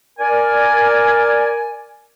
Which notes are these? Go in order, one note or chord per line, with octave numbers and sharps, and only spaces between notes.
A#4 D5 G#5